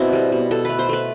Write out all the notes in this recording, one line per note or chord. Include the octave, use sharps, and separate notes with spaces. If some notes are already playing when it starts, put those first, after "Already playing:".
Already playing: B2 B3 C4 E4
G3
B2
B2 A4
A3 B4
C5
A3 B4